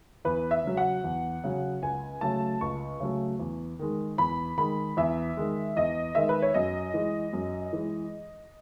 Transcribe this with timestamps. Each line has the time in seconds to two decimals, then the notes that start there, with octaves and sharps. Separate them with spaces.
0.25 E2 B4
0.51 E5
0.64 C#3 F#3
0.77 F#5
1.04 E2
1.44 C#3 F#3
1.82 C#2 G#5
2.21 C#3 F#3 A3 A5
2.61 C#2 C#6
3.00 C#3 F#3 A3
3.39 E2
3.79 D#3 G#3
4.18 E2 B5
4.57 D#3 G#3 B5
4.97 E2 E5
5.37 D#3 G#3
5.76 E2 D#5
6.15 D#3 G#3 E5
6.29 B4
6.42 C#5
6.54 F#2 D#5
6.94 E3 G#3
7.33 F#2
7.73 E3 G#3